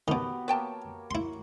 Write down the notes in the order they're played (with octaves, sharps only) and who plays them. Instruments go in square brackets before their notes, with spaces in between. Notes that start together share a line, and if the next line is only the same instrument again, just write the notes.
[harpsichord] B2 D#3 [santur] B3 F#4 G4
[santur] A#3 C#5 [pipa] B4 G5 A5
[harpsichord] E4 C6